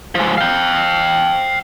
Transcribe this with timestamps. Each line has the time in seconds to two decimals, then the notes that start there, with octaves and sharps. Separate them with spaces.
0.15 F3 G#3
0.38 F5 G5